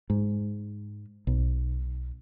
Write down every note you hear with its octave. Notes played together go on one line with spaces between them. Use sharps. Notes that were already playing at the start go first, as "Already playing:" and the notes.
G#2
B1